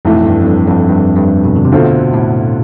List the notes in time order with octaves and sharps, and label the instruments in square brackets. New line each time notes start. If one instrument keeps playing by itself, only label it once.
[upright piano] B1 A2 E3 A3 [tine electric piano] F2
[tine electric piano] G2
F2
G2
F2
G2
G2
B2
D3
C3
[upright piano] D2 D3 A3 C4 F4 [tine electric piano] B2
[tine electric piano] A2